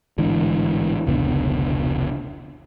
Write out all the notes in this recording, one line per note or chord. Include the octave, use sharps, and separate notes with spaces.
A1 G#2 D3 E3
F1 C#2 B2 D3